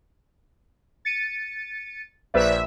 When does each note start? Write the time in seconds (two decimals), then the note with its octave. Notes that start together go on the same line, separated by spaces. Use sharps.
1.05 A6 C#7 D#7
2.34 A#1 B4 C5 D5 E5